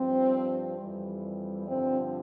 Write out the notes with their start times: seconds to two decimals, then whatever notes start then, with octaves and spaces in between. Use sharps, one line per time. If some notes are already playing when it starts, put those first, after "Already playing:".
Already playing: G2 F3 C4
0.78 F2 E3 G3
1.66 G2 D3 F3 C4